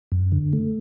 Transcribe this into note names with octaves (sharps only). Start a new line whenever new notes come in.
F#2
D3
A3